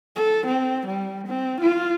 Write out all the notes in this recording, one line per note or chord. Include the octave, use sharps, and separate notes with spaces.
A4
C4
G3
C4
F4